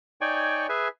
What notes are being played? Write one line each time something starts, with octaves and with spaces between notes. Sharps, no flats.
D#4 C#5 D5 G5 G#5 C#6
G#4 B4 E5 G#5